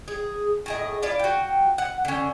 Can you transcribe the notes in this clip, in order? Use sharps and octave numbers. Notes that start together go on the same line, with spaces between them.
G#4
A2 G#4 D#5
E4 F4 D5 F5
F#4 G5
F#5
D3 C#4